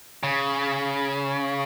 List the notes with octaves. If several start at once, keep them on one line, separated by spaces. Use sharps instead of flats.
C#3